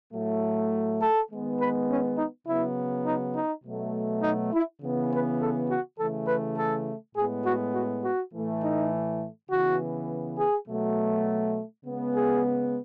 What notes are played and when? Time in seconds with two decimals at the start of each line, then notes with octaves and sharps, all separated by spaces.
0.12 A2 F#3 A3
1.00 A4
1.30 D#3 G#3 B3
1.59 B4
1.89 C#4
2.18 D#4
2.48 C#3 F#3 B3 E4
3.06 D#4
3.35 D#4
3.64 B2 F#3 A3
4.23 D#4
4.53 E4
4.82 C#3 E3 B3
5.11 B4
5.40 A4
5.70 F#4
5.99 C#3 E3 A3 A4
6.28 B4
6.58 A4
7.16 A2 G#3 B3 G#4
7.46 F#4
7.74 F#4
8.04 F#4
8.33 A2 E3 A3
8.63 D#4
9.51 C#3 E3 B3 F#4
10.39 G#4
10.68 B2 F#3 A3
11.85 C#3 G#3 B3
12.14 G#4